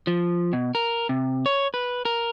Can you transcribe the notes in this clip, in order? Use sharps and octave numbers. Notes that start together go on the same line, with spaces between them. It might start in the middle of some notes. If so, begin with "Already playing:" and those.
F3
B2
A#4
C3
C#5
B4
A#4